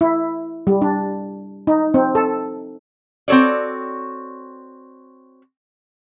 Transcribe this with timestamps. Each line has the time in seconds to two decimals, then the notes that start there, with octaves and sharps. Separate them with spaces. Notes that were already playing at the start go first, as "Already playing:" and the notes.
0.01 E4
0.67 G3
0.82 D4
1.67 D#4
1.94 C4
2.15 A4
3.28 C4 F#4 A4 C#5 D5